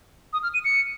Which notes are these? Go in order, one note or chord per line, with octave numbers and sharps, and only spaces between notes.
D#6
F6
D#7
C#7